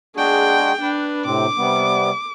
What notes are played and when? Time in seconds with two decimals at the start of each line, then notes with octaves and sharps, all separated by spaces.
0.16 G#3 D4 F#4 G#4 G5
0.82 D4 B4
1.25 A2 C3 C4 D6
1.58 C3 G3 B3